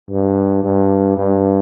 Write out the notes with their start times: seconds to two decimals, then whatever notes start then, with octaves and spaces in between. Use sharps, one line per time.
0.11 G2
0.64 G2
1.17 G2